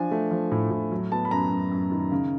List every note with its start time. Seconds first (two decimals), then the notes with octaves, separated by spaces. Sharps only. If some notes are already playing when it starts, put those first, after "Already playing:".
Already playing: F3 D4 G#5
0.11 A3
0.31 F3
0.51 A2
0.71 A2
0.91 F#3
1.12 B3 A5
1.25 B5
1.31 F#2 A#5
1.52 F#2
1.71 F#2
1.92 D#3
2.11 C#3